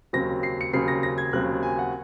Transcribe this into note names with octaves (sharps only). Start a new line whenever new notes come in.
D#2 C#3 F#3 C4 A#6
C7
C#7
D#2 C#3 F#3 C4 C7
A#6
A#6
G#6
D#2 C#3 F#3 C4 F#6
G#5
F#5